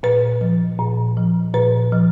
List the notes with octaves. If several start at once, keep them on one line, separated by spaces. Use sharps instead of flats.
A#2 B4
F3
A#2
F3
A#2 B4
F3